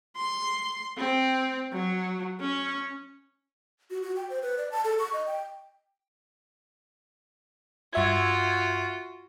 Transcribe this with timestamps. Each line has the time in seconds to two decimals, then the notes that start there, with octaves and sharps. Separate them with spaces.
0.17 C6
0.97 C4
1.72 F#3
2.41 C#4
3.90 F#4
4.03 F#4
4.16 G5
4.30 C5
4.42 B4
4.58 D5
4.72 A5
4.84 A4
4.99 C#6
5.13 D#5
5.27 G5
7.93 G2 F4 F#4 E5 G#6